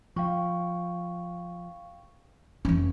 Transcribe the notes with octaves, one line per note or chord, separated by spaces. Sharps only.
F3 F5 G5 C#6
F1 E3 C#4